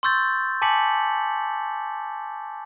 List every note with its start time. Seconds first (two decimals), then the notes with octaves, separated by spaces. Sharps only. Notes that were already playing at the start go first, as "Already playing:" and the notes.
0.03 C6 C#6 E6 G6 A6
0.62 G#5 A5 D6 B6 C#7 F#7